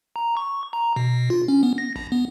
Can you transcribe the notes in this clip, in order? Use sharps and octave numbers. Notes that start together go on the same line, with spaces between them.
A#5
C#6
A#5
B2
F4
C#4
B3
A#6
A#1
B3